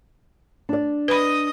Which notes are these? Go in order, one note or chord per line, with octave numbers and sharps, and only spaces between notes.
D4 D5
B4 D#5 B5 D#6